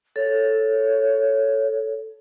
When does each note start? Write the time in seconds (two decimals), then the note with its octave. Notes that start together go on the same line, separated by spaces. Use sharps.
0.16 A4 C#5